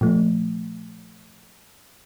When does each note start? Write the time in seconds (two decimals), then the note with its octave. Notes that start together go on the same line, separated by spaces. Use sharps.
0.01 A#2 F3 A3